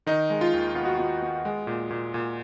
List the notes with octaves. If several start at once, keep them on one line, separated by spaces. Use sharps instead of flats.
D#3 D#4
G#3
F4
D#2
B3 F4
F#4
B3 F4
B3
G#3
A#2
A#2
A#2